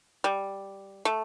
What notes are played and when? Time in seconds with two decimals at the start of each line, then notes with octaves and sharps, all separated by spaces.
0.24 G3
1.05 A3